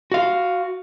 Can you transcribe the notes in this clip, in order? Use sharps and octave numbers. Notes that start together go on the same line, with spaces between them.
F#4 F5